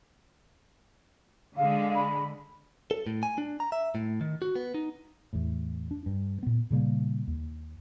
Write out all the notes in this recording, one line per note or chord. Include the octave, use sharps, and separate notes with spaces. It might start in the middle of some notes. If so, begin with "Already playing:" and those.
D3 G#3 F5
B5
A4
A2
G#5
D4
A#5
E5
A2
D#3
F#4
B3
D#4
E2 A2
D4
G2
A#2 B3
A#2 C#3 G3 A#3
D#2